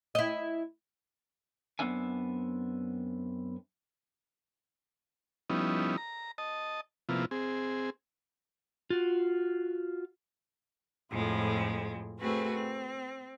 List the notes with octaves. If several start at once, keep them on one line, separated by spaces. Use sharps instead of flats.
E4 D#5
F#2 B3 C4 D4 E5 G#5
F3 G3 B3 C#4 D#4 E4
A#5
D#5 A5
C3 F3 A#3 B3 E4 F4
C4 G#4
F4 F#4
F2 A2 F3 G#3
A3 C4 F#4 G#4 B4
C4